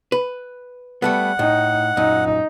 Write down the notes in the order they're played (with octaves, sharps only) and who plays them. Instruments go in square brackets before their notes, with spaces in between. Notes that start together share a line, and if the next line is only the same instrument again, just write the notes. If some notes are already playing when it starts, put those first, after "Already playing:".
[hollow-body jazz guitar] B4
[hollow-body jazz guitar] G3 A3 B3 [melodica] F#5
[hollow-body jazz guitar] A2 [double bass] D#4
[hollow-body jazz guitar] F#2 A#2 [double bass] D#4